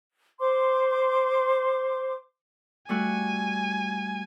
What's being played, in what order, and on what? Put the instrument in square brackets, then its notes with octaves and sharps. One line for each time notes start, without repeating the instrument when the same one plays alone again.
[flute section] C5 C6 D6
[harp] G3 A3 F#4 [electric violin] G#5